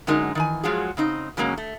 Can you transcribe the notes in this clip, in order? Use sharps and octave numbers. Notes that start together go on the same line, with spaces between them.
F#2 D3 F#3 G#3 D#4 A#4
D#3 E3 G#5
F3 F#3 G#3 F4 F#4 G#4
C#3 C4 D#4 D#5
C#3 F#3 G#3 A#3 C#4
A3